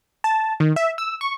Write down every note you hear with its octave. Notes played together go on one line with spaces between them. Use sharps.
A5
D#3
E5
E6
C#6